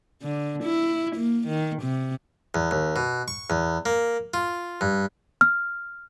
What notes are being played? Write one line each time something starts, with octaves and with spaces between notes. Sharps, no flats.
D3
E4
A#3
D#3
C3
E2
D#2
B2
C#6
E2
A#3
F4
G2
F6